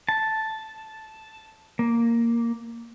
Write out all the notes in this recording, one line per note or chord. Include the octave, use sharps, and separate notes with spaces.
A5
A#3